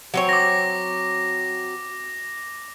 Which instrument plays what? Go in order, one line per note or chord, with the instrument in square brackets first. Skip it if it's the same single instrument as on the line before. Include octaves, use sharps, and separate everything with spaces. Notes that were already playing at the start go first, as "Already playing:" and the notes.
[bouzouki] F#3 C4 C#5
[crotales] D6 A#6